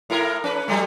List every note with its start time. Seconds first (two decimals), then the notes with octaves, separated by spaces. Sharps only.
0.10 A2 E4 A#4
0.44 C#4 B4
0.68 F#3 G3 A3